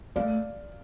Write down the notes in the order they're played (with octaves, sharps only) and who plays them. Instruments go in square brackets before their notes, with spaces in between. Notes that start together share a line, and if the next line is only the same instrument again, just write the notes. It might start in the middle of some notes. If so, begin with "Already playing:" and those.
[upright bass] A3 [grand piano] D5 F5